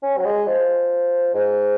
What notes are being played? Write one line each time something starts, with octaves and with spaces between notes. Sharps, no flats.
C#4
F#3
G#3
F3
G#2